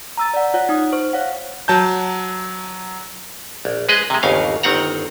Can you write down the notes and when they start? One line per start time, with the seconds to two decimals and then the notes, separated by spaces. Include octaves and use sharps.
0.18 A#5 E6 A6
0.34 D5 F#5
0.54 F4 C#5 F#5
0.69 D#4 D#6
0.93 C5 C#6
1.13 C#5 F5 F#5
1.68 F#3 A5 G6
3.65 A#1
3.89 G#3 G#4 B4 D#5
4.10 C3 G#3
4.23 G1 D#2 C#3 F5
4.63 G1 D#3 C4 F#5 A#5